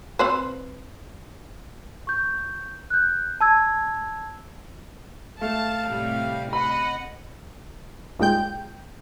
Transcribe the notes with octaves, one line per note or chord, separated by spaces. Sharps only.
C4 B4 C5
C#6 G6
F#6 G6
A5 E6 G#6
A3 F5 A5
A2 C3 G3
D#5 F#5 B5
D#2 A#2 G#3 G5 G6